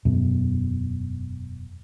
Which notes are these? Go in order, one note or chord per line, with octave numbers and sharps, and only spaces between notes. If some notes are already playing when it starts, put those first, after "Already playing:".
E1 F#2 B2